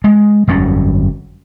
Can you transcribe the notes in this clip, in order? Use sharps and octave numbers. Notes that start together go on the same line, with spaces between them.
G#3
G1 F2 F#3 C#4